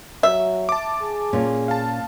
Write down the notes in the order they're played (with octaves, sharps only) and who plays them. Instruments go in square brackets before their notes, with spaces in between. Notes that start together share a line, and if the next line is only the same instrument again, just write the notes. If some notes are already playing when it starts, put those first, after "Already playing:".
[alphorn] F#3 [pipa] E5
[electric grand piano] A5 D6
[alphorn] G#4
[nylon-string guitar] A#2 C#4
[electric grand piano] F5 A5